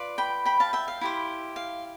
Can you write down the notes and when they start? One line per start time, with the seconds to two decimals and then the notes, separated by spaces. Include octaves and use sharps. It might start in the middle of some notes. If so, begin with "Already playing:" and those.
Already playing: F4 B4 D5
0.18 G5 B5
0.45 G5 B5
0.60 F5 A5
0.73 E5 G5
0.88 F5
1.01 E4 G4 C5
1.56 F5